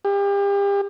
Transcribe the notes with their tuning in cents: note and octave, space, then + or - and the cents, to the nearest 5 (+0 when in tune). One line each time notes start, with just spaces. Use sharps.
G4 +35